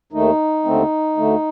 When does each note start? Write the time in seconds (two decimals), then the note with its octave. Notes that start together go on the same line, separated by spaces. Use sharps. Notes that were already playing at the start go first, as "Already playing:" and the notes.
0.12 D#2 D#3 A3 D#4
0.64 D#2 D3 A3 C4
1.17 D2 D3 A3